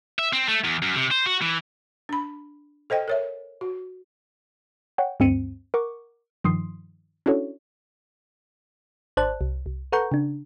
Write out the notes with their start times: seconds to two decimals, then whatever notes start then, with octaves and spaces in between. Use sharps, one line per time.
0.19 E5
0.33 C4
0.48 A3
0.64 E2
0.82 F#2
0.96 C3
1.11 C5
1.26 F#4
1.42 E3
2.09 D4 B5
2.90 A4 C5 D#5 G5
3.08 A#4 C#5 E5
3.61 F#4
4.98 C#5 F#5 G5
5.20 D2 G2 C4 C#7 D#7
5.74 A#4 F#5 C#6 D6
6.44 G2 D#3 F3 C6 D#6 C7
7.26 C#4 D4 E4 F#4 A4 C#5
9.17 G#1 C5 D5 A5 F#6
9.41 C2
9.66 C2
9.92 A4 B4 F#5 A#5 C#6 G6
10.12 C#3 D4